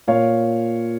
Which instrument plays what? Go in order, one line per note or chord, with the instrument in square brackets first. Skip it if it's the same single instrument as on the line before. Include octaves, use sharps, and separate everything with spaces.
[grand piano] A#2 C#5 F5